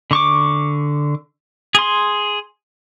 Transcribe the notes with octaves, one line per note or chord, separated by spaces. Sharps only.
D3 C#6 D6
G#4 C6